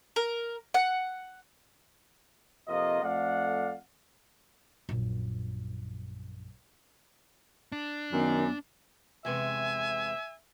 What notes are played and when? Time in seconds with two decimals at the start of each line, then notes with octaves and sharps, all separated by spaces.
0.16 A#4
0.74 F#5
2.68 F2 C3 A#3 F4 D#5
3.02 F2 A3 D5 F5 F#5
4.89 A#1 F#2
7.72 D4
8.13 F#2 D#3 B3
9.25 E2 C3 G#3 E5 G#5